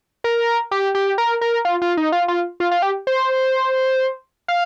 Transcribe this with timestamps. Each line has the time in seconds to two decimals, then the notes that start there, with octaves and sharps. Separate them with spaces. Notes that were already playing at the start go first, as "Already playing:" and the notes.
0.24 A#4
0.71 G4
0.95 G4
1.18 A#4
1.41 A#4
1.65 F4
1.82 F4
1.97 D#4
2.12 F4
2.28 F4
2.60 F4
2.71 F4
2.82 G4
3.07 C5
4.48 F5